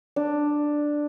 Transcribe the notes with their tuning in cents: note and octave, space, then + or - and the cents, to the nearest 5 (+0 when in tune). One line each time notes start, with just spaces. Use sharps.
D4 +5